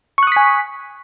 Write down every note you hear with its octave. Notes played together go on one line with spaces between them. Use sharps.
G#5 C#6 D#6 F#6 B6